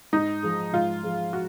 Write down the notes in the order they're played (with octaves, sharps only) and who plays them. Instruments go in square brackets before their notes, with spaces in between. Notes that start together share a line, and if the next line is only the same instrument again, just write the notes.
[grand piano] G#2 [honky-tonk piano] D#4
[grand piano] F3 G#3
[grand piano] G#2 [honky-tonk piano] F4
[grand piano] F3 G#3
[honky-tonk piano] F#4